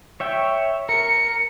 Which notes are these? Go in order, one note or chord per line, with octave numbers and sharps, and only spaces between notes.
C#5 E5 G5
A#4 C#7